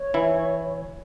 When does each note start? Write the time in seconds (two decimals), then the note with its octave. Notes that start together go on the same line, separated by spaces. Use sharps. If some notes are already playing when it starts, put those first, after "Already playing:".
Already playing: C#5
0.14 E3 E4